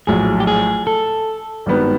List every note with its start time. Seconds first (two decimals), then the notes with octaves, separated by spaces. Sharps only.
0.07 A#1 A2 F#3 G#4
0.40 G4
0.47 G#4
0.87 A4
1.66 G#1 G2 D#3 G3 B3